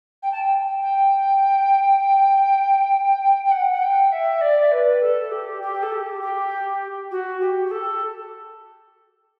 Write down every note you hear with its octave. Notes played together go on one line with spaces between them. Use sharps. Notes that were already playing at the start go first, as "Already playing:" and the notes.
G5
A5
G5
G5
G5
F#5
F#5
G5
E5
D5
B4
A4
G4
G4
A4
G4
G4
F#4
G4
G4
A4